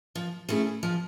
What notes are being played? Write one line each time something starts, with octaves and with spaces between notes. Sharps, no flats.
F3
A3 C#4 E4 G#4
F3